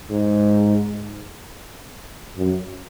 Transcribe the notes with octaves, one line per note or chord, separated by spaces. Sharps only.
G#2
F#2